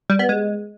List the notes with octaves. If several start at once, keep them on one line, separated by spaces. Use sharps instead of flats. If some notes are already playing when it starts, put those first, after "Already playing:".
G3
B3
G#3